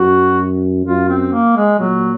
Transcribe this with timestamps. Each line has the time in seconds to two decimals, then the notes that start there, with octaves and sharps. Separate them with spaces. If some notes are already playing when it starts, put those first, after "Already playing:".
Already playing: F#2 F#4
0.85 F#2 F4
1.09 C4
1.33 A#3
1.56 G#3
1.79 A#2 F#3